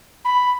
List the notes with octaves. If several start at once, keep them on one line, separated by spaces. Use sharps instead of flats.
B5